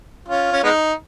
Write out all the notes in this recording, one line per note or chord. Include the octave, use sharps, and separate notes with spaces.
C#4 F4
C#4
G#3 B3 D#4